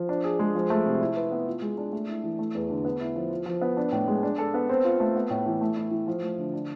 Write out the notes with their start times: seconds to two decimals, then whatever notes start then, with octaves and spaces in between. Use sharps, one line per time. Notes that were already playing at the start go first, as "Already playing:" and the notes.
Already playing: F3
0.09 D4
0.24 G#4
0.39 G#3
0.55 F3
0.70 A3
0.86 C3
1.01 E4
1.16 B4
1.31 B3
1.47 F4
1.62 G#3
1.78 D4
1.93 A3
2.08 E4
2.24 E3
2.39 A3
2.55 E2
2.70 D3
2.85 B3
3.01 E4
3.16 F3
3.31 F4
3.46 F3
3.61 B3
3.77 D4
3.92 A2
4.08 G#3
4.23 D4
4.38 A4
4.54 B3
4.69 C4
4.84 F4
5.00 A3
5.15 B3
5.30 A2
5.46 E3
5.61 A3
5.76 E4
5.91 E3
6.07 F3
6.22 A3
6.38 D3
6.54 D4